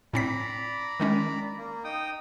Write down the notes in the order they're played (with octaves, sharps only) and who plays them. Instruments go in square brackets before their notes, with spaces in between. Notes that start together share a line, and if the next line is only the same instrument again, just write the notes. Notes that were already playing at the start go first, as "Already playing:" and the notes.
[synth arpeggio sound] A2 C4 B6 [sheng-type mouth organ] D5 A#5 B5
[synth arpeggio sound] D#3 G#3 C#4
[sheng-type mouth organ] A#3
D#4 G5 D#6